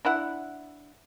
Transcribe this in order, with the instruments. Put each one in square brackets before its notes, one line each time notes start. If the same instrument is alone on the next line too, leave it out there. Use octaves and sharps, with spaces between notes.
[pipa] D4 E4 F#5